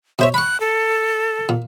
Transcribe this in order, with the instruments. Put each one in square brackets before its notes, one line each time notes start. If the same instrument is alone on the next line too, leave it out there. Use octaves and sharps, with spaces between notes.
[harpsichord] B2 C5 C#5 [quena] E5
[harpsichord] B5 C#6 [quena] F#6
[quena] A4
[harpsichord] A#2